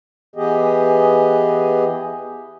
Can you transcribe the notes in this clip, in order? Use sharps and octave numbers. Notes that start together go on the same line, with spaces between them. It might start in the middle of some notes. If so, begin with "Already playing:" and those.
E3 B3 G4 G#4 D#5